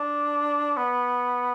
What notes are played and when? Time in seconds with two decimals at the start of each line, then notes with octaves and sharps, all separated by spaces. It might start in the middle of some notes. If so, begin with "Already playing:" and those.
Already playing: D4
0.77 B3